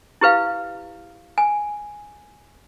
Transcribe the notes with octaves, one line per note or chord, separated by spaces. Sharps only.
E4 G4 B4 F5
G#5